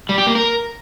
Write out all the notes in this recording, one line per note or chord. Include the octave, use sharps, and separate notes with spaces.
G3
G4
A#3
A#4